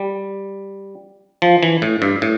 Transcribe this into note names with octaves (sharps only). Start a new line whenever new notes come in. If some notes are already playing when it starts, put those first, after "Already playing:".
Already playing: G3
F3
E3
A2
G2
A2